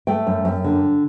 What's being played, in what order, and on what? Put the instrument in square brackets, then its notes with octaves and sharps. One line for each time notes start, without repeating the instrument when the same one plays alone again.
[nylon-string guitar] A3 G5
F#2
F#2
D3